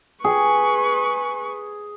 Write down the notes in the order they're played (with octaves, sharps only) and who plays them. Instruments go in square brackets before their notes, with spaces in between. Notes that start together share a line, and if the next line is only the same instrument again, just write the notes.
[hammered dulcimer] G#4 [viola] B4 C#6